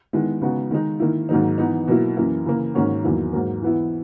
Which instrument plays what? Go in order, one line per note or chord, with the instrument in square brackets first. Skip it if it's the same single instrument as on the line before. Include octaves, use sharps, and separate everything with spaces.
[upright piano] D#3 G#3 B3 E4
C#3 G#3 B3 D#4 F#4
D#3 G#3 D#4
D#3 A#3 E4
G#2 D#3 F#3 A#3 D#4
E3 B3 D#4
B2 F#3 A#3 E4
F#2 E3 A#3 E4
C#3 E3 A#3
G#2 D#3 A#3 C#4 F#4
E2 D#3 F#3 A#3 E4
G#2 F#3 A#3
E3 B3 E4